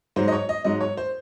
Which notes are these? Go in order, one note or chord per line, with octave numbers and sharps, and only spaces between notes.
G#2 F#3 C5
D#5
C#5
D#5
G#2 F#3 D#5
C#5
C5